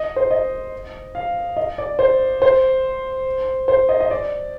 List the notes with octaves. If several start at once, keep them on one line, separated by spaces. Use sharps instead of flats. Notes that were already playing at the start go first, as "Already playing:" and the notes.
Already playing: D#5
C5
D#5
F5
D#5
D5
C5
C5
C5
D#5
D#5
D5